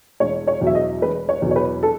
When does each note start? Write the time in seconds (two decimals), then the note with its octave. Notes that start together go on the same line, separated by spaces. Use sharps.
0.20 E1 C#5
0.47 C#5
0.61 E2 B2 F#3
0.67 E5
0.75 D#5
1.02 E1 B4
1.29 C#5
1.42 E2 B2 F#3
1.51 C#5
1.56 B4
1.83 A4